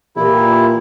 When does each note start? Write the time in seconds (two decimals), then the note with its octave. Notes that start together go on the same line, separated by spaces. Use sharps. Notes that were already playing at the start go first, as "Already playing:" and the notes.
0.16 A#2 E3 E4 G4